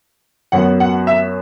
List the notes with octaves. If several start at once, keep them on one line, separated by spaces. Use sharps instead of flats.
F#2 F#3 B3 F#5
F#5
E5